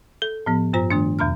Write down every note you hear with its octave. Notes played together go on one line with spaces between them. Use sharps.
A4
A2 F3 B3
G2 F4 C5 A#5
D#3 A3 D4
E2 B2 A#5 F6